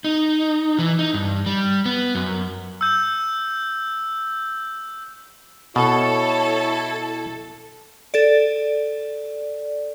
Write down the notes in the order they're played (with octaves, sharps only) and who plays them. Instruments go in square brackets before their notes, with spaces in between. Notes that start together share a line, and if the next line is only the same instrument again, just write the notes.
[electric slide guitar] D#4
E3
D#4
G2
G3
B3
F#2
[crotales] E6 G6
[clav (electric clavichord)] B2 [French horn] E4 [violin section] A4 [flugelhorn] C#5
[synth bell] A4 D5